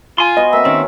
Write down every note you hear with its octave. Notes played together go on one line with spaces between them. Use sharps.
F4 G#5 C6
B3 F#4 D#5
A#3 C4 E5
D#3 C4 C#4